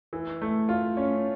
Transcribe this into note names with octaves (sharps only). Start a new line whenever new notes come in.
E3
A3
F4
C#4